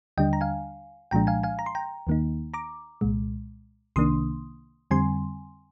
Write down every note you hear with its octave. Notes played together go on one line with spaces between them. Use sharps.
D#2 D3 G3 D4 D#5 G5
A#5
F5 G#5
C2 A#2 F3 G#3 D4 G5 A#5
F5 G#5
F5 G#5
A#5
C6
G5 A#5
D#2 D#3 A#3 D#4
A#5 D6
C2 A#2 G#3
C2 C3 D#3 A#3 D4 C6 D#6
F2 D3 G3 C4 G#5 C6